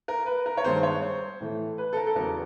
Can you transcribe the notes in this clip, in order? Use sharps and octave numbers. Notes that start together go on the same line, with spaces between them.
A#4
B4
A#4
C#5
G2 D#3 G#3 B3 C5
C#5
C5
A2 E3 A3
B4
A4
A#4
A4
E2 C#3 F#3 B3 A#4